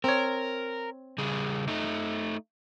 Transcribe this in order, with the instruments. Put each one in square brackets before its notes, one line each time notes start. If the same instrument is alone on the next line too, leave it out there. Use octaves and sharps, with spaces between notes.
[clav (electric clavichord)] C4 C#5 [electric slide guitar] A#4
[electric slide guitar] C#3 G3 G#4
A3 D#4